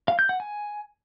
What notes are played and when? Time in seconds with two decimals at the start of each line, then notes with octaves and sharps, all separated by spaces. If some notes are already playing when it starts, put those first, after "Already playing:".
0.08 F5
0.19 G6
0.29 F#5
0.40 G#5